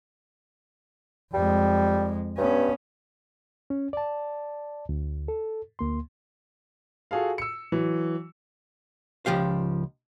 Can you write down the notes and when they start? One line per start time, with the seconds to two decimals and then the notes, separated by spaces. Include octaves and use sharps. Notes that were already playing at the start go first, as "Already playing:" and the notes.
1.34 F2 G3 G#3
2.38 G2 B3 C#4
3.70 C#4
3.93 D5 A5
4.89 D2
5.28 A4
5.79 D2 A#3 C6
7.11 F4 F#4 G#4 A4 F5
7.38 E6 C#7
7.72 E3 F#3
9.26 C#2 F3 G4 F5